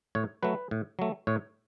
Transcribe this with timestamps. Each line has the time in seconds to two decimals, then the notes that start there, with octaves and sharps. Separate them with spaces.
0.15 A2 C#5
0.43 F#3 A3 B4
0.71 A2
0.99 F#3 A3
1.27 A2 C#5